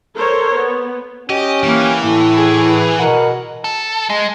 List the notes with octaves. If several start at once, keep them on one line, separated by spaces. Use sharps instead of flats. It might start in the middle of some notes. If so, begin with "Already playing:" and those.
A4 A#4 C5 C#5
B3
C#4 G4 D#5
E3 A#3
A2 A4
G#4
B4
B2 A#4 F#5
A4
G#3